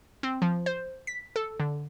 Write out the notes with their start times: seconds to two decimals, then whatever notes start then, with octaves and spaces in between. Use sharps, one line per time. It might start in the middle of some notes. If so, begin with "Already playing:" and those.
0.23 C4
0.42 F3
0.66 C5
1.07 B6
1.36 A4
1.60 D3